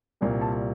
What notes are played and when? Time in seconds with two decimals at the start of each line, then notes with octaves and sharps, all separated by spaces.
0.21 C2 A#2 G3 A#3
0.41 A5